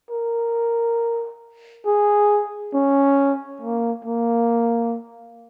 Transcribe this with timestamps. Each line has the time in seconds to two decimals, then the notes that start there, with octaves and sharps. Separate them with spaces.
0.10 A#4
1.86 G#4
2.74 C#4
3.62 A#3
4.05 A#3